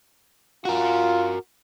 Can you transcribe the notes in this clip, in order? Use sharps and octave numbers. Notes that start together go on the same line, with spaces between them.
F4 F#4 A#4